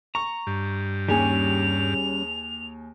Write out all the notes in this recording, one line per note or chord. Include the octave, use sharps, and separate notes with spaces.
A#5 C#6
G2
D#2 G3 C#4 G#4 G#5 F7